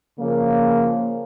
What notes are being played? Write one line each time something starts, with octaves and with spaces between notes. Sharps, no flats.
C#3 F3 A#3